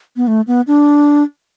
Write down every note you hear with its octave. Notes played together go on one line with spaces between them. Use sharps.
B3
A3
B3
D4